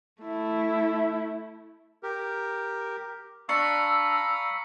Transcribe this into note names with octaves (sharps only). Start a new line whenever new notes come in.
A3 E4
G4 A#4
D4 F5 A#5 B5 C#6 E6 C#7